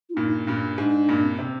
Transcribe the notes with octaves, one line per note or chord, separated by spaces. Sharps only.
F4
G2 A#2 D#4
G2 A#2
G#2 D4
G2 A#2
C4
C3